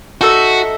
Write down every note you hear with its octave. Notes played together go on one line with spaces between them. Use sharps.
D#4 F#4 A4 E5